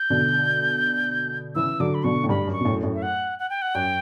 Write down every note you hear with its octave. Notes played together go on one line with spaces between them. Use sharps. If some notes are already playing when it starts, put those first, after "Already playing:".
Already playing: G6
B2 D3
C#3 E3 E6
D3 F#3 D6
B5
B2 D3 C#6
A2
G2 B5
F#2
C#6
B2
F#2 A2
F#2 A2
E5
F#5
F#5
G5
F#5
F#2 G5